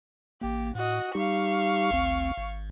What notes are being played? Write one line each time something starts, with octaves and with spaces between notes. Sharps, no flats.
A1 A#3 G4
A2 F#4 D#5
G3 D#4 G4 F5 C#6
G#1 D2 C4
G#1